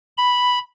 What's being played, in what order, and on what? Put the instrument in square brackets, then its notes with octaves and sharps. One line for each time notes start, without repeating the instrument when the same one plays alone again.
[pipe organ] B5